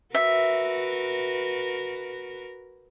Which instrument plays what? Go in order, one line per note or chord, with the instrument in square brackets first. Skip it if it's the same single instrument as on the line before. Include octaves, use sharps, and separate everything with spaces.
[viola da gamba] F#4 A#4 B4 [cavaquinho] E5